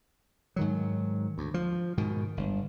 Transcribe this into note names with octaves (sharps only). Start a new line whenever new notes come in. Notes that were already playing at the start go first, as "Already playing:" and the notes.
G#2 D#3 F#3
D2
F3
G#2 B2 D#3
G1